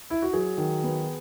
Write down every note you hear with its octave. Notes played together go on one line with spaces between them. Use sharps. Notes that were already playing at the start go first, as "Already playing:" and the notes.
E4
F#4
F#3 G#4
D#3
B3